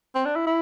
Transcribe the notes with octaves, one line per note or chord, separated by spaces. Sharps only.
C4
D4
E4
E4